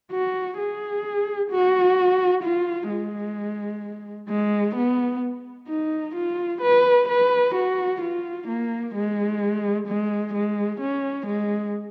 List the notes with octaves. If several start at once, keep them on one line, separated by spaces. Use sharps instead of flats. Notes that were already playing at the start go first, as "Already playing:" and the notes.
F#4
G#4
F#4
F4
G#3
G#3
B3
D#4
F4
B4
B4
F#4
F4
A#3
G#3
G#3
G#3
C#4
G#3